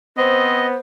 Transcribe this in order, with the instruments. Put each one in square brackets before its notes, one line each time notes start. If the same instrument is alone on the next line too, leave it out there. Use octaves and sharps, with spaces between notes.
[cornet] B3 [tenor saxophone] C4 [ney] C5 [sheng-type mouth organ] D#5